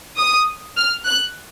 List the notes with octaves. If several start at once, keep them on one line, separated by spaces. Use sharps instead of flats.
D#6
F6
F#6